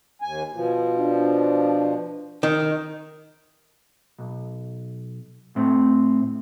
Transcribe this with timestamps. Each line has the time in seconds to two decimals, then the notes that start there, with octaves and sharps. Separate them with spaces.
0.22 D#2 G#5
0.53 B2 F3
0.98 D4
2.43 D#3
4.19 B1
5.56 A2 C4